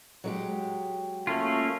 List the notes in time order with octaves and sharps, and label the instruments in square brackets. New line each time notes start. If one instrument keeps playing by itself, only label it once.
[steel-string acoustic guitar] F#3 G#3 G4
[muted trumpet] A3 [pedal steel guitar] A#3 C#4 F4